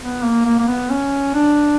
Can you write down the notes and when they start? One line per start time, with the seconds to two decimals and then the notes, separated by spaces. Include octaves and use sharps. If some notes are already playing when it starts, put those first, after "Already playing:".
0.01 B3
0.23 A#3
0.45 A#3
0.59 A#3
0.68 B3
0.90 C#4
1.34 D4